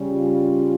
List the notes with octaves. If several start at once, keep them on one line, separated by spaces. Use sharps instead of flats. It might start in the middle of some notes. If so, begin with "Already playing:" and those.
Already playing: C#3 G3 C#4
F4